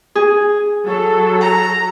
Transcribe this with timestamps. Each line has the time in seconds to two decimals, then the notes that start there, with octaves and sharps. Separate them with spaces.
0.15 G#4
0.85 F#3 A4
1.41 A#5